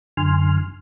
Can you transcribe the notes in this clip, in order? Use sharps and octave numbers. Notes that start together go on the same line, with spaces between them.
F#2 D3 G#5 C6 F6